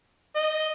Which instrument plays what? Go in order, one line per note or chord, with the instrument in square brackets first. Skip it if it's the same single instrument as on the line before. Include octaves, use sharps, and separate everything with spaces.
[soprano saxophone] D#5